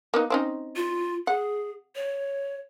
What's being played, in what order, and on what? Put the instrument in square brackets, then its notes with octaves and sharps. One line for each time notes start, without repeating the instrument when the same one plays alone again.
[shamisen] A#3 B3 D#4
C4 C#4 D#4
[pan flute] F4
[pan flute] G#4 [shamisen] F#5
[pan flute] C#5